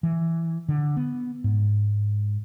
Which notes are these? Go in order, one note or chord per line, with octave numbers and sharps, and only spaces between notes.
E3
D3
B3
G#2